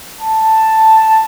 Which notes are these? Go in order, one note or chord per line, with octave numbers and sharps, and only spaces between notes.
A5